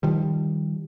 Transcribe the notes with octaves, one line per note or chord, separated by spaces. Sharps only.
D#3 F3 G3